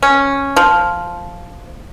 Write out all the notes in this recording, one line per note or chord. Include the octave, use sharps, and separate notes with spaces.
C#4
F3